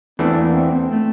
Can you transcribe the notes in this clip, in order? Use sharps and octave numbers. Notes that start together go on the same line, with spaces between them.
E2 E3 A3 C4 D4
A#3
C4
C4
A3